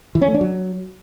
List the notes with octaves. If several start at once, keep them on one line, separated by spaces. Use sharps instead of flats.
E3
C#4
A3
D4
F#3